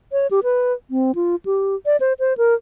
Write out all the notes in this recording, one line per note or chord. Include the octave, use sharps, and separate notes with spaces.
C#5
G4
B4
C4
F4
G4
D5
C5
C5
A#4